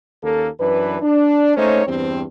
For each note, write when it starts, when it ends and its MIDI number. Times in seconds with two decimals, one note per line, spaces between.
0.23 0.48 39
0.23 0.48 58
0.23 0.48 61
0.23 0.48 69
0.60 0.98 42
0.60 0.98 52
0.60 0.98 62
0.60 0.98 71
1.02 1.54 62
1.57 1.85 57
1.57 1.85 58
1.57 1.85 61
1.57 1.85 63
1.57 1.85 72
1.57 1.85 73
1.86 2.23 40
1.86 2.23 43
1.86 2.23 60